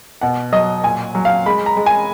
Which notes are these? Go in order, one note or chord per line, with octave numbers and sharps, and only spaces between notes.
B2 F#5
F#3 D#5
A#2 G#5
F#3
F5
G#3 B5
A#5
G#3
G#5